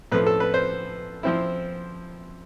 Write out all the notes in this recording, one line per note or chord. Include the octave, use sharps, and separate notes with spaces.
A2 F3 A3 B4
A4
B4
C5
F3 C4 E4